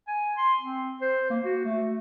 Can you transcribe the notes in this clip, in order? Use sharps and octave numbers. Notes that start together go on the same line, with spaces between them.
G#5
C6
C4
C5
A#3
F#4
A3